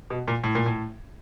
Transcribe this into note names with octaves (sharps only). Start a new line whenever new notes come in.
B2
A#2
A2
A#2
A2